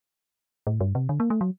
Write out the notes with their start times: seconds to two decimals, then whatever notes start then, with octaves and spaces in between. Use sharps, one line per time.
0.67 A2
0.81 G2
0.95 C3
1.09 D3
1.20 A#3
1.30 A3
1.41 F#3